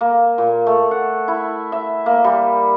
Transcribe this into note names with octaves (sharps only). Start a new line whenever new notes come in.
A#3
A#2
A3
F#5
E4
E5
A#3
G3